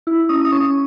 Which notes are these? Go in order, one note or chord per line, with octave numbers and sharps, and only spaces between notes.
E4
C#4 D#6
D#6
C#4 C#6